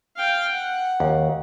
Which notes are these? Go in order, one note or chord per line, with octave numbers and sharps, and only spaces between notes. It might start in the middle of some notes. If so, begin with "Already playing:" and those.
F5 G5
F#5
D#2